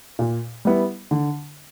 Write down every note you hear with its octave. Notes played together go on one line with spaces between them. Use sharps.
A#2
G3 B3 E4
D3